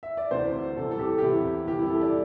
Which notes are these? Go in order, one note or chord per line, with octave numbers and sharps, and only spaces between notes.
E5
D5
D2 C3 E3 C5
C2 C3 E3 A4
A4
G4
G4
E2 C3 E3 E4
C2 C3 E3 G4
E4
A4
D5